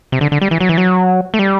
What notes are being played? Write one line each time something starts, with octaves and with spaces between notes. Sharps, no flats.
C3
D3
D3
G3
E3
F#3
E3
F#3
A3
G3